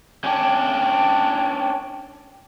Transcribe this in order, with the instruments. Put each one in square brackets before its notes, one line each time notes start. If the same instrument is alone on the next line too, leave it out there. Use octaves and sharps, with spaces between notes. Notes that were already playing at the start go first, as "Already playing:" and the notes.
[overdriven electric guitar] C#4 D4 [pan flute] G5